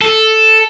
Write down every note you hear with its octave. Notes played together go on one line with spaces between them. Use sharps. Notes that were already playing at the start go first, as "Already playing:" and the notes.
A4